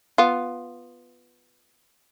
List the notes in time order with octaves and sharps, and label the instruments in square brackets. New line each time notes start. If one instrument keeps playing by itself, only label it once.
[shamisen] B3 F4